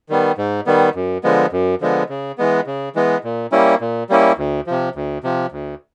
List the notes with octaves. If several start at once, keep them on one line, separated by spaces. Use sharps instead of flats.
D#3 G3 B3
G#2
D#3 G3 B3
F#2
D3 F3 G#3 B3
F#2
D3 F3 G#3 B3
C#3
E3 G#3 B3
C#3
E3 G#3 B3
A#2
G3 A#3 C#4 E4
A#2
G3 A#3 C#4 E4
D2
C3 F3
D2
C3 F3
D2